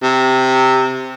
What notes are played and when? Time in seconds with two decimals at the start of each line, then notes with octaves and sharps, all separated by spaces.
0.03 C3